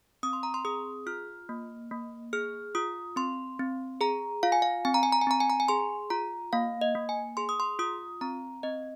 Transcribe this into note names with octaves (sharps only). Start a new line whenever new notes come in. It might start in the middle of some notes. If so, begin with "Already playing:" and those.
C4 D#6
C6
A#5
C6
G#4 D#6
F4 F6
A#3
A#3
G#4 F6
F4 D#6
C4 C6
C4
G#4 A#5
F4 F5
G#5
F5
C4 G#5
A#5
G#5
A#5
G#5
C4 A#5
G#5
A#5
G#5
G#4 C6
F4 A#5
A#3 F5
D#5
A#3
G#5
G#4 C6
D#6
C6
F4 D#6
C4 A#5
C4 D#5